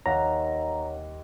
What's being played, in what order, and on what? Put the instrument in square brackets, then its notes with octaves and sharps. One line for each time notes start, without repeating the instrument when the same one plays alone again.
[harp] D#2 [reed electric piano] C#5 F5 F#5 [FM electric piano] A#5